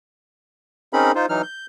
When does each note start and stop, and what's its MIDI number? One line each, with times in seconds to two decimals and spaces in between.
0.93 1.12 60
0.93 1.12 61
0.93 1.12 63
0.93 1.12 68
0.93 1.12 70
0.93 1.12 83
1.15 1.26 63
1.15 1.26 65
1.15 1.26 72
1.29 1.42 52
1.29 1.42 54
1.29 1.42 63
1.29 1.42 89
1.43 1.66 91